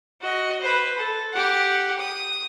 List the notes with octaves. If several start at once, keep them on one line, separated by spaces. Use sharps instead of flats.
F#4 D#5
B4 C5
A4
G4 F#5
D#6